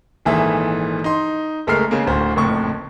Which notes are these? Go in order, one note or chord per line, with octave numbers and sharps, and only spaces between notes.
G#1 A#2 E3 G#4 A4 E5
D#4 C6
F#1 G#3 A3 A#4 F6 C7
C#3 G#3 A#3
D1 D2 C5
F#1 F2 A2 C#6